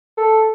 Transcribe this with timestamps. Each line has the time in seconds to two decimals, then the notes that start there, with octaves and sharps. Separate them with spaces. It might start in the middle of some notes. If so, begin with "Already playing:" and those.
0.17 A4